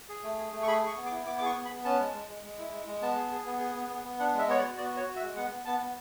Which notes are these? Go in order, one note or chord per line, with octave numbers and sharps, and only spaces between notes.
G#4
A3
G#4
A3
C#6
G#4 B5
G#4 C#6
B3
D6
E4
B3 D6
D6
G#4 C#6
B3
B5
B3
C#4 A5
G#3
G#3
G#3
G#3
E4
G#3
G#3
B3 A5
G#4
G#4
B3
G#4
B3
B3
B3
D4 F#5
G#3 E5
B3 C#5
D5
F#4
B3 D5
F#4 C#5
F#4
E5
G#3
B3 F#5
B3
B3 A5
B3